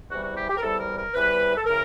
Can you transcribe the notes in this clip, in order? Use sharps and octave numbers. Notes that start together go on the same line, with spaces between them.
E2 C3 E3 G3 F#4
F#4
G4
G4
A#4
E2 C3 E3 G3 A4
A#4
A#4
E2 C3 E3 G3 B4
A4
C#3 E3 A#4